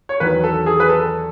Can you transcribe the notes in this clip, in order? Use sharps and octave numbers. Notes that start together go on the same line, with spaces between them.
C#5
E2 D#3 F#3 B4
A4
G#4
B4
A4